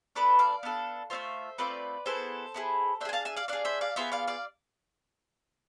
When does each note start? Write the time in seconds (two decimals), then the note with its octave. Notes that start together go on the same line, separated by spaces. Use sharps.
0.16 B3 D4 A4 B4 D5
0.39 D5 F5
0.63 B3 D4 A4
1.10 A3 C4 F4 C5 E5
1.58 A3 C4 F4 B4 D5
2.06 B3 E4 G#4 A4 C5
2.54 B3 E4 G#4
3.01 D4 C5 E5
3.05 G#4 G#5
3.13 F5 A5
3.25 E5 G#5
3.36 D5 F5
3.48 D4 G#4 D5 F5
3.65 C5 E5
3.81 D5 F5
3.96 B3 F4 G#4 C5 E5
4.12 D5 F5
4.27 D5 F5